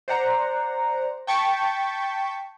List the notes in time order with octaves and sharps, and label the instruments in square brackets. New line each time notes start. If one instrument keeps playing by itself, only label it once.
[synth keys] C5 D5 F#5 A#5
G5 A5 C#6 G6 A6 B6